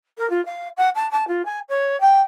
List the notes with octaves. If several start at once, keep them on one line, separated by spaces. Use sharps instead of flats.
A#4
F4
F5
F#5
A5
A5
F4
G#5
C#5
G5